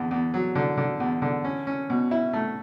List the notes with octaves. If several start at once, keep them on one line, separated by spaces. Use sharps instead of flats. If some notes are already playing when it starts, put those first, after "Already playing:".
Already playing: E2 D3
E2
F#3
D3
D3
E2
D3
C#4
C#4
B2
E4
A3